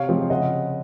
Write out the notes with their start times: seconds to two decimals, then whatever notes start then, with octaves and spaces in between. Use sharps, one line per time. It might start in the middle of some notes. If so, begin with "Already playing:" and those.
Already playing: C3 C#5 F5
0.08 F3 G#3 C4
0.30 C#3 D#5 F#5